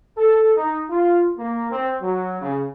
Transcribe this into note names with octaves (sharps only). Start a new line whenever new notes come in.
A4
D#4
F4
A#3
C4
F#3
C#3